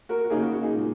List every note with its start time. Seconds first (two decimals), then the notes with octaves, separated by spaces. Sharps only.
0.09 F#4 A#4
0.24 F#4
0.30 C#3 A#3 D#4 G#4
0.42 F#4
0.53 F#4
0.63 D#4 G#4
0.74 A#2 G#3